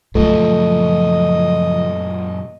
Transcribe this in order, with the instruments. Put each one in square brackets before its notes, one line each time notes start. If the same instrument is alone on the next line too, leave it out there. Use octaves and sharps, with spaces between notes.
[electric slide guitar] F#2 A#2 [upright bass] C#3 F3 [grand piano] A3 [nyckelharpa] D#5